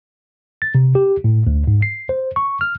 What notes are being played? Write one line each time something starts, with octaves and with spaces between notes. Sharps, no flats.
A6
C3
G4
A2
D2
G#2
C7
C5
C#6
F6